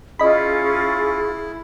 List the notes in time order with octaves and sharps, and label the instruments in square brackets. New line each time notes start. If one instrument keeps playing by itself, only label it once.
[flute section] C#4 F4 [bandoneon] E4 [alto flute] G#4 [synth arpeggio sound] D#5 B5